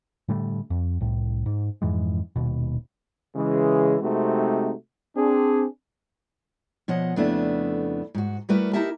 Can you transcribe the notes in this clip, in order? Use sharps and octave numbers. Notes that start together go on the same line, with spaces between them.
A2 D3 G3 A3
F2
C2 A2
G#2
F2 G#2 E3 G#3
D#1 D#2 B2
C#3 E3 G#3
C3 G#3 A3 C4 D#4 F#4
C4 D4 G#4
B2 F3 C#5 D#5 F#5
F2 C#3 A3 B3 D4 E4
G#2 F#4
G3 A3 E4 F#4 A#4 B4
D#4 E4 G4 A#4 E5 A5